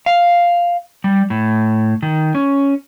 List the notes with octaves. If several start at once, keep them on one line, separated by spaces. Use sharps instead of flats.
F5
G3
A2
D#3
C#4